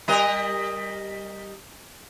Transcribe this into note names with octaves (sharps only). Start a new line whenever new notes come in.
G3 A#4 D#5